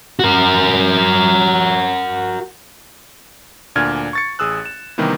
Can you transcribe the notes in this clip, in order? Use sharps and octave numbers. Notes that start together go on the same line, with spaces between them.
F#4 A#4
D2 A#2 D4 G#5 F6 G#6
C#6 A6 C#7
A1 G#4 D#6 E6 F#6
E7
C3 D#3 E3 G3 A#3 B3